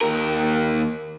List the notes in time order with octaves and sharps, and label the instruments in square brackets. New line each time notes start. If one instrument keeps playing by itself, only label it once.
[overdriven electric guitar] D#2 A#4